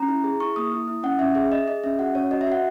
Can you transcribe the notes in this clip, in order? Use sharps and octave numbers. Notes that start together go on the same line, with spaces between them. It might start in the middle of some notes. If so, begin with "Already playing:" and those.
Already playing: C#4 A#5
E4
G#4
E4 C#6
A#3 D#6
E4
E4
C#4 F#5
C#4 E5
G#4 E5
G#4 D#5
G#4 D#5
C#4 E5
F#4 F#5
C#4 C#5
F#4 D#5
E5
F#4 F#5